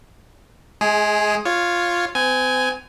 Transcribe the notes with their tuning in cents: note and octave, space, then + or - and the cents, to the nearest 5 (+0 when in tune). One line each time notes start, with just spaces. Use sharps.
G#3 +30 G#4 +0
F4 +0 C#5 +0
C4 -40 G#5 +0